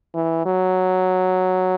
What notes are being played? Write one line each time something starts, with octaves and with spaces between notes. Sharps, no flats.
E3
F#3